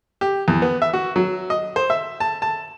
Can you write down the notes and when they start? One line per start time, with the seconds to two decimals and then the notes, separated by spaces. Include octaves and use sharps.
0.21 G4
0.48 E2
0.62 B3
0.82 E5
0.93 F#4
1.16 F#3
1.50 D#5
1.76 C5
1.90 E5
2.20 A5
2.42 A5